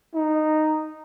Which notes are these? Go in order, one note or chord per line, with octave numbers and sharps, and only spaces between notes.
D#4